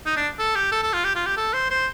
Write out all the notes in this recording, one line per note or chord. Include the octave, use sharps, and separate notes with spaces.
D#4
D4
A4
G4
A4
A4
F4
G4
F4
G4
A4
C5
C5